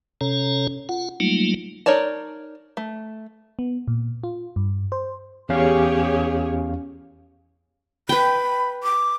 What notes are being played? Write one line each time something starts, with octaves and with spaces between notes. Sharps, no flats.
C3 C#4 A4 C#5 A#5
F4 F#5
F#3 G3 A3 A#3 D#4 F4
D#4 A#4 C#5 D5 A5
A3
B3
A#2
F4
G2
C5
E2 C#4 G4 G#4 C#5 F5
B4 G5 B5
D6